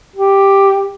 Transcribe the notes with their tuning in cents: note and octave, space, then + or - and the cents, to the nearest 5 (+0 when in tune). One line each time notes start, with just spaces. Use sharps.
G4 +0